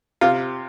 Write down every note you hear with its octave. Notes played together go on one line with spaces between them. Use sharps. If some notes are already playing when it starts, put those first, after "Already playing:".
C3 F4